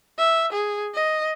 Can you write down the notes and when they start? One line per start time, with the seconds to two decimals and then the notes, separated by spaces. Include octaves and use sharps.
0.18 E5
0.53 G#4
0.94 D#5